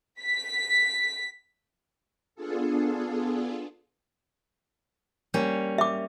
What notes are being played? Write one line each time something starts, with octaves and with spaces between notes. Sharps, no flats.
B6
B3 D4 F4 G#4 A4
G3 A#3 C#4
E5 D6